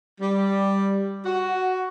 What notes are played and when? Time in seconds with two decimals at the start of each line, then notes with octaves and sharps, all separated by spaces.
0.21 G3
1.26 F#4